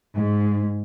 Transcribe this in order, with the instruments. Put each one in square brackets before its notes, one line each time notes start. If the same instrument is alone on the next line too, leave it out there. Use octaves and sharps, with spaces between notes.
[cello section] G#2